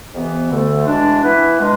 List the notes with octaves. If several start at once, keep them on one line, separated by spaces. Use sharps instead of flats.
F2 C3 E3 B3
D2 D3 A3
E2 B2 G#3 D4
E3 B3 E4 B4
B2 G#3 D4